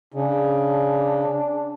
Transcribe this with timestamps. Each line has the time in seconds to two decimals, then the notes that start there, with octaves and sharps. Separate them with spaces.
0.14 C#3 D4